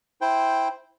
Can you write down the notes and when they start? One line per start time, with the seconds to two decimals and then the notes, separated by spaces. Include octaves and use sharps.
0.21 E4 C5 G5